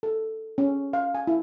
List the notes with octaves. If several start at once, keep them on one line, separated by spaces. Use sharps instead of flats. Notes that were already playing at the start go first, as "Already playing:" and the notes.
A4
C#4
F5
G#5
E4